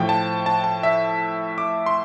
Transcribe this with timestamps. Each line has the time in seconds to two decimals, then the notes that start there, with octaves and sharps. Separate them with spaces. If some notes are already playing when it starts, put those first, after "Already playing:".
Already playing: A2 F3 G5
0.09 A5
0.46 A5
0.64 A5
0.83 E5
1.58 D6
1.86 C6